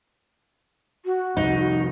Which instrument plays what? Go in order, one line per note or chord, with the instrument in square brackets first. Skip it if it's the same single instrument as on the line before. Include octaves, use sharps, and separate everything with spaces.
[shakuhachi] F#4
[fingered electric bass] C2 F2 [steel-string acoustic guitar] D#4